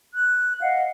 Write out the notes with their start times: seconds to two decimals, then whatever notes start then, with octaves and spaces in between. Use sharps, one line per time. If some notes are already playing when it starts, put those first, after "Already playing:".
0.14 F#6
0.61 D#5 F5 F#5